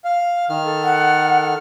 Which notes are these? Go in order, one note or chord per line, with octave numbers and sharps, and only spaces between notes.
F5
D#3 F6
A4
F#5